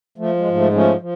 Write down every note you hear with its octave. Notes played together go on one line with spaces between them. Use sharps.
F3 A3
G#3
G#2
A3
F3 A3 C#4
F3